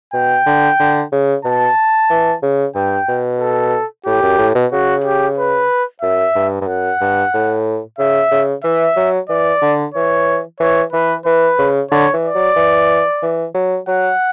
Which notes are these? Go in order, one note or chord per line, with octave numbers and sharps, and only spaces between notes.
B2 G5
D3
D3
C#3
B2 A5
E3
C#3
G2 G5
B2
A4
A2 G4
F#2
A2
B2
C#3 F#4
G4
B4
F#2 E5
G2
G2
F#2 F#5
G2
A2
C#3 E5
C#3
E3 E5
F#3
E3 D5
D3
E3 C#5
E3 C#5
E3 B4
E3 B4
C#3
D3 C#5
E3
D5
F#3
E3
E3
F#3
F#3 F#5